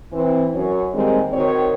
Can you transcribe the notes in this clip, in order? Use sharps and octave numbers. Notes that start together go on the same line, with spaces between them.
E3 C4
F#2 C#5
D#2 D#3 G3 G#3 C4
D#3 C4 F#4 C#5